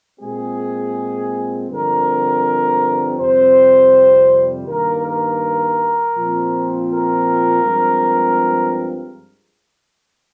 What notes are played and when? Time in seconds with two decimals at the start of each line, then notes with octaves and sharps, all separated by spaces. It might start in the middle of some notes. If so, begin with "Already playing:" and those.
0.20 A#2 G#3 C4 G#4
1.69 G2 D3 F3 C4 A#4
3.18 F2 C3 G3 C4 C5
4.66 G2 D#3 A#3 A#4
5.04 A#4
6.15 A#2 F3 C4
6.90 A#4
7.64 G2 F3 G#3 C4